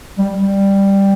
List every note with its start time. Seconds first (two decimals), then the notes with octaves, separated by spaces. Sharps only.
0.18 G3
0.37 G3